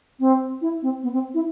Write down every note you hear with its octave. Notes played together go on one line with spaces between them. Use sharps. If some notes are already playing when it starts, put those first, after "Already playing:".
C4
E4
C4
B3
C4
E4